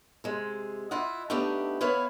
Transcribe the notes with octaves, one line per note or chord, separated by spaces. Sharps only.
C3 G#3
E4 F4 D#5 F#5
A3 B3 D4 D#4 G4
B3 E4 B4 C#5 F5